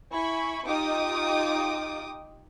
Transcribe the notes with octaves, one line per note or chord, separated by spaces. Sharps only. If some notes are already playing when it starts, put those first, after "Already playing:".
E4 G#5 B5 C#6
D#4 F4 G4 G5 D6 D#6